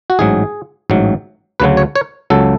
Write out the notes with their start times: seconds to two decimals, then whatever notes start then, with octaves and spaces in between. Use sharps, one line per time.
0.10 F#4
0.19 A1 G#2 F#3 G#4
0.90 A1 G#2 F#3
1.60 D2 C#3 F#3 B4
1.77 C#5
1.96 C#5
2.30 C#2 C#3 F#3 A4